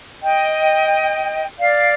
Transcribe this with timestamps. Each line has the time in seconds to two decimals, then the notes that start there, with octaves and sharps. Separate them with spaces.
0.21 D#5 G5
1.58 D5 F5